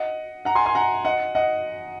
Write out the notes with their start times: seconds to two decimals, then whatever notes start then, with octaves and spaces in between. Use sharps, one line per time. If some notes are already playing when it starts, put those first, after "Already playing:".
Already playing: D#5 F#5
0.45 F#5 A#5
0.55 G#5 C6
0.66 G#5 C6
0.75 F#5 A#5
1.05 D#5 F#5
1.35 D#5 F#5